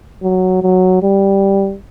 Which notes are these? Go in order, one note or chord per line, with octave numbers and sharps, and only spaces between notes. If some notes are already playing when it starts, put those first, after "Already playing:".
F#3
F#3
G3